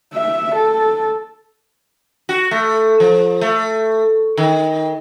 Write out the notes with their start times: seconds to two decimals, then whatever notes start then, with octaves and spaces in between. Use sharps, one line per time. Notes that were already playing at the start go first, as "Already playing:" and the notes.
0.13 E5
0.55 A4
2.29 F#4
2.51 A3
3.00 F3
3.41 A3
4.37 D#3